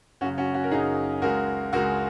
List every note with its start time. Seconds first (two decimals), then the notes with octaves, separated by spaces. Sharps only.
0.21 F#1 F#2 C#3 F#3 C#4 F#4
0.38 C#4 F#4
0.54 C#4 F#4
0.64 A#4
0.71 F#1 F#2 C#3 F#3 D#4 G#4
1.22 C#2 C#3 G#3 F#4 A#4
1.73 C#2 C#3 G#3 F#4 A#4